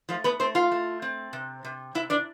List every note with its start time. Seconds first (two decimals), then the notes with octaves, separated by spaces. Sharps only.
0.09 F3 A3 F4
0.24 B3 B4
0.39 A3 C4 C5
0.55 F4 F5
0.72 A3
1.02 C4
1.33 C3
1.65 C3
1.95 C3 E4 E5
2.10 D4 D5